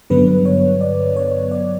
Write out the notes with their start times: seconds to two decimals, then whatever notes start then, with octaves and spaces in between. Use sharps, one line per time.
0.10 G2 D3 F#3 B3 B4
0.45 C#5
0.81 D5
1.16 C#5
1.51 D5